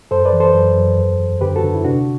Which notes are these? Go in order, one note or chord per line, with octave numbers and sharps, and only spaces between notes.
F#2 A4 C5
B4 D5
E3
A4 C5
F#2
F#2
E2
E2
D3 G4 B4
F#4 A4
D3
E4
C3 D4 F#4